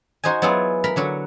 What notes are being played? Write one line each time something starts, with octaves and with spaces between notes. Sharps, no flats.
D#4 F#4 C5 D#5 G#5
F#3 B3 E4 F4 G#4
A#4 A#5 B5
D3 F#3 F#4